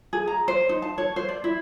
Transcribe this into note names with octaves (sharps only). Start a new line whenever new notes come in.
G#4
A#5
C5
D#4
A5
C#5
C5
D5
E4